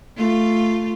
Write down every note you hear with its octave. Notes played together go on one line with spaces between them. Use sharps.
A3 F4